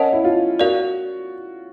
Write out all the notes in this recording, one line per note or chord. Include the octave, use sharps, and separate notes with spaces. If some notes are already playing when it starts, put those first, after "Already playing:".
Already playing: C#4 A#4 D#5 F#5 A5
E4
F4
F#4 A#4 D5 F5